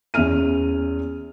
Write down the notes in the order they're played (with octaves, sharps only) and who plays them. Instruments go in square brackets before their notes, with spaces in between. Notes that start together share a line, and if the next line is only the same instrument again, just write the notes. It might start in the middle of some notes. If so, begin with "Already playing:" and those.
[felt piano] E2 C#4 E5 F6 D#7